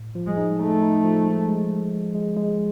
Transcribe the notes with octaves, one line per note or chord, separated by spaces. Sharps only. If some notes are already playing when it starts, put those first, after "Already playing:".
Already playing: A2
F3
G#3
D#4
A3 D#4
D#4
F3
G#3
G#3
G#3
G#3
G#3
G#3